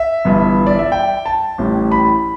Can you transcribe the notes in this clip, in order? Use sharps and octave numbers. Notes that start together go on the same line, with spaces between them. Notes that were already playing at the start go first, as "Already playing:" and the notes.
Already playing: E5
G1 G2 E3 B3
D5
E5
G5
A5
A1 A2 G3
B5